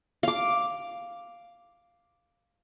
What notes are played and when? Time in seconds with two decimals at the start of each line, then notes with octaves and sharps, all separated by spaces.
0.23 F5 D6